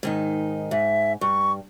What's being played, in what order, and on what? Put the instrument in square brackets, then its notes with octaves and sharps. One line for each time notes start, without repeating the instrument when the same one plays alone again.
[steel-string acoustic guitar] G#2 D#3 D#4
[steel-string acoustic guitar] G#2 [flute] E5
[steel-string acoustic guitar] G2 [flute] C#6